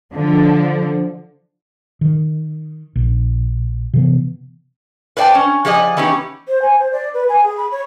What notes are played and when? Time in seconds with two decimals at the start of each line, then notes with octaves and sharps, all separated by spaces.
0.13 D3 F3
2.01 D#3
2.96 A#1
3.94 C3 E3 B3
5.17 B4 C5 D5 F#5 G5 A5
5.35 C#4
5.65 F3 G4 G#4 D5 D#5
5.97 E3 B3 C#4 D#4 G4
6.47 C5
6.62 G#5
6.79 C5
6.92 D5
7.14 B4
7.29 G#5
7.44 G#4
7.57 B5
7.72 C#5